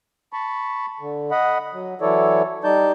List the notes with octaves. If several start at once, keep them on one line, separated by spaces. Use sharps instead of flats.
A5 B5 C#6
D3
D#5 F#5 B5
F#3
E3 F#3 E4 A4 C#5 D5
G3 D#4 D5 A5 G6